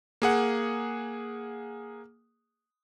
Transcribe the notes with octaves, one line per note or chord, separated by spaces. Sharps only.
A#3 G#4 F#5